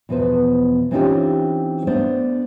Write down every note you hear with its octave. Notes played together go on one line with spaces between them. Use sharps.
E2 B2 F3 B4 C5
E3 C4 C#4 D#4 F4 G4
A3 B3 D4 C5 D5